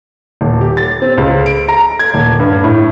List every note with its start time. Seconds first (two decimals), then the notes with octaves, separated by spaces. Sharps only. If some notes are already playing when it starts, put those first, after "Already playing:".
0.41 D#1
0.61 G4
0.77 A6
1.02 C4
1.18 C#2
1.46 D7
1.68 A#5
1.99 G#6
2.14 D#1
2.40 G2
2.64 A2